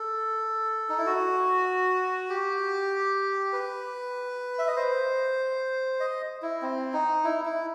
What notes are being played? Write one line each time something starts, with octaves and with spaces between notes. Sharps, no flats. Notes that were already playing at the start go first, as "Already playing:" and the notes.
Already playing: A4
D#4
E4
F#4
G4
B4
E5
D#5
C5
D#5
E4
C4
D#4
E4
E4